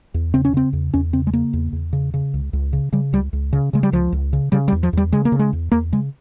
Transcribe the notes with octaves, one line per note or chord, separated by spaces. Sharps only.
E2
C#3 C4
C#4
C#3 C4
E2
E2 C#4
C#3 C4
G#3
C#3 A#3
E2
E2
C#3
C#3
C#2
C#2
C#3
C#3 G3
C#2 G3
C#2
C#3
C#3 G#3
G3
C#2 F3
C#2
C#3
C#3 G3
G3
E2
F3
E2 G3
C#3 G#3
A#3
C#3
G#3
E2
E2 A#3
C#3 G#3